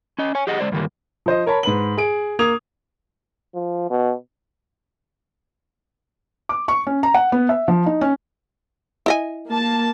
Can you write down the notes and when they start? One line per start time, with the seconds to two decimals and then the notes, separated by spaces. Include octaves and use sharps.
0.19 C#4 D#5
0.35 C#5 G#5
0.47 G4 G#4 D#5 F#5
0.59 G#3 C5 D5
0.72 G2 D3 D#3 G3 A#3
1.26 F3 C5 D#5
1.46 A#4 C#5 A5 B5
1.63 G#2 B4 F#7
1.98 G#4 D7
2.39 A#3 D#6 G#6 F7
3.55 F3
3.91 B2
6.49 D6
6.68 C#6
6.87 C#4
7.03 A#5
7.14 F#5
7.32 B3
7.49 E5
7.68 F3
7.86 D#4
8.01 C#4
9.06 E4 D#5 G#5
9.48 A#3 A5